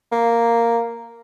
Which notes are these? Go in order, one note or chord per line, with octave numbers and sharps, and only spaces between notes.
A#3